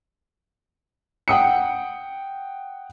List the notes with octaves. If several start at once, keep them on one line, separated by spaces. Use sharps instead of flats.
F#5 G5 D#6 C#7